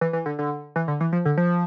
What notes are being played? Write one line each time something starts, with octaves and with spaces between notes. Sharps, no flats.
E3
E3
D3
D3
E3
D3
E3
F3
D3
F3